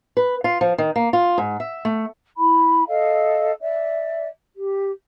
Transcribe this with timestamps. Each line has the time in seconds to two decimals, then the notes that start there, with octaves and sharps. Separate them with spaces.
0.17 B4
0.44 F4
0.61 F3
0.78 D#3
0.96 A#3
1.13 F4
1.38 G#2
1.60 E5
1.85 A3
2.37 E4 B5
2.88 A4 D#5 F5
3.60 D5 E5
4.56 G4